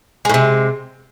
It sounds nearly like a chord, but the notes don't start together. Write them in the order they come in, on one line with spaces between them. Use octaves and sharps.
G#3 A2 C3